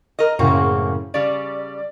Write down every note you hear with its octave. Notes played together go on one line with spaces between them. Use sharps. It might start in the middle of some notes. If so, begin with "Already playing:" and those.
A#4 D#5
F#2 A2 C#3 A#3 C4 F#4
C#3 G3 D5